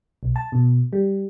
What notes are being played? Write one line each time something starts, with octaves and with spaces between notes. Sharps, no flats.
B1
A5
B2
G3